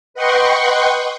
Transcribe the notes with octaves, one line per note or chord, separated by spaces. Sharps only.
B4 D#5 F#5 G5 C6 C#6